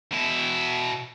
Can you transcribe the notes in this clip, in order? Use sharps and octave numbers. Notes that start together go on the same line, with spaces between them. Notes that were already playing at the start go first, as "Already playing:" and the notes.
B2 E4